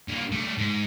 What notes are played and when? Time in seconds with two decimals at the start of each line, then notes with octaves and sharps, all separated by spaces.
0.08 G2 A#3
0.32 G3 A3
0.58 G#2